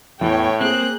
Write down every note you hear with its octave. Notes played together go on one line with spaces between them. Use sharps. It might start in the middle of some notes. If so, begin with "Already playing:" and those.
E2 A2 E3 C#5 G5
A#3 C4 G#4 F#6 G6